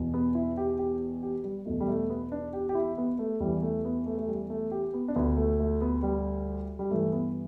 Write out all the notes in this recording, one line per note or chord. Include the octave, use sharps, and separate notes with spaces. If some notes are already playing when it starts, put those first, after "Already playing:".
Already playing: E2 B2
B3
E4
G4
G4
G4
G3
E2 B2 A3
G3
A3
B3
D4
G4
G4
E4
B3
A3
E2 E3 G3
A3
B3
A3
A3
G3
A3
G4
B3
D4
D2 D3 B3
A3
A3
B3
G3
G3
G2 E3 A3
B3